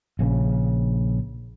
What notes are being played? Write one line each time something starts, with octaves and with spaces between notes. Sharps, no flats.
A#1 C#3 F3 C#4